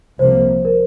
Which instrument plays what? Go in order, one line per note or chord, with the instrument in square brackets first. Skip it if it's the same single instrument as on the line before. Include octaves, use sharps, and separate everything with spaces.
[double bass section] C2 C3 F3 A#3 [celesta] C5
[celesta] A#4